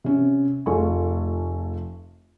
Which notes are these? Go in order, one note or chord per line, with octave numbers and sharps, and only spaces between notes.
C3 C#4
F1 A3 F4 G#4 G#5 C#6